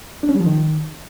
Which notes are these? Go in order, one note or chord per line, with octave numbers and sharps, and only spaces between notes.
D4
C#4
G3
F3
D#3